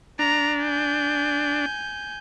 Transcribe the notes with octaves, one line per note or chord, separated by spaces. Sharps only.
D4 A#5
G#5 G6